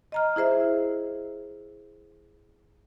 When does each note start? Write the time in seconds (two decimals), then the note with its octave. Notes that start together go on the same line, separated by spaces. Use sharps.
0.12 D#5 A#5 F6
0.36 E4 G#4 C5 E5